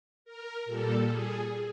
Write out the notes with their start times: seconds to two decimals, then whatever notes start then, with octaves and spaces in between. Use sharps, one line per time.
0.25 A#4
0.65 A#2 G3 A4
1.06 G#4